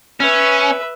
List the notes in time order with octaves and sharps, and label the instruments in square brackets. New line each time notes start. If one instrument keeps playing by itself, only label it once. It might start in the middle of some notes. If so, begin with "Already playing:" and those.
[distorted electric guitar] C#4 [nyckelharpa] B4 E5